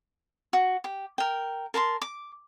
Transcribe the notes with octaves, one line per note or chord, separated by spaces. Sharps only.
F#4
G4
A#4 G5
A#4 A5 B5 C6
D6